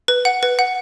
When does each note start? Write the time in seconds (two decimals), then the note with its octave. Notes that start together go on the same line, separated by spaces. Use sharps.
0.08 B4
0.25 F#5
0.43 B4
0.59 F#5